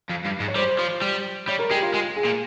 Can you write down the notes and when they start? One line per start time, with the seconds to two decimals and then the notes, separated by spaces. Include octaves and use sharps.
0.10 F2
0.25 G2
0.40 G#2
0.48 C#5
0.55 G3 C5
0.79 F3
1.02 G3
1.48 G3 C#5
1.59 A#4
1.70 G#3 G4
1.82 F4
1.94 G#3
2.16 G#4
2.24 A#2